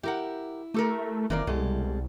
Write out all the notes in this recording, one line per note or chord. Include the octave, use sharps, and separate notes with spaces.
E4 G4 A#4 F#5
A3 G4 A4 A#4
F#1 D#3 E3 A#3 C4 A#4 D5
C2 B2 G3 G#3 A4